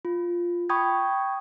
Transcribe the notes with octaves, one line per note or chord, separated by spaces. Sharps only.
F4
G5 B5 C#6 D#6 G6 G#6